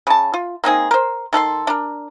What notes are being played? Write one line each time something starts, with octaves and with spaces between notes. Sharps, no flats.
C#3 A5
F4
A#3 C4 D#4 G#4
A#4 C5
D#3 A4 B5 C6
D4 A#4